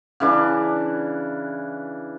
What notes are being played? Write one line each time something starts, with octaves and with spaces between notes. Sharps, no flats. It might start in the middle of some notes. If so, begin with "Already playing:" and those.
C#3 E3 D4